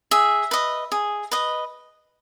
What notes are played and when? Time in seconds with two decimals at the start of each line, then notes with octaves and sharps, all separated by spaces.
0.11 G#4 E5
0.51 B4 D#5
0.92 G#4
1.31 B4 D#5